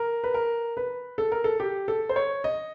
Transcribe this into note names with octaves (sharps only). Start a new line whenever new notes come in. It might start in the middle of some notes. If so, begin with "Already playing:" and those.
Already playing: A#4
B4
A#4
B4
A4
A#4
A4
G4
A4
C5
C#5
D#5